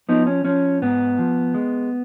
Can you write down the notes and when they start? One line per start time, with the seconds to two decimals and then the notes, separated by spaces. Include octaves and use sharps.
0.09 F3 B3 D#4
0.27 C#4
0.45 F3 C#4
0.82 G#2 B3
1.19 F3
1.54 G#3